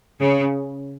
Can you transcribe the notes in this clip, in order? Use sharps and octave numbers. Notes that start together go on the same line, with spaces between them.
C#3